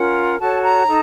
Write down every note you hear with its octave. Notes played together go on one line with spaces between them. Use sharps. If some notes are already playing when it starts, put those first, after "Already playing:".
Already playing: C#4 F4 A#4 F#5
F#4 A4 C#5 A5
A#5
D#4 A4